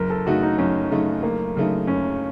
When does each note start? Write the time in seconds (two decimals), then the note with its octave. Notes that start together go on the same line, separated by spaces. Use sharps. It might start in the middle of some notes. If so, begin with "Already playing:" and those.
Already playing: F#1 A#4
0.10 A4
0.26 F#2 C#3 A3 D#4 F#4
0.43 D#4
0.58 F#1 C#4
0.91 F#2 C#3 A3 D#4
1.22 F#1 A#3
1.55 F#2 C#3 A3 D#4
1.87 F#1 C#4